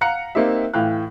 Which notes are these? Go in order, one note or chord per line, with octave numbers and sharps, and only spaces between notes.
F5 F#5 A#5 F#6 C#7
A#3 C4 D#4 G4 E5
A2 E3 F5 G5 F#6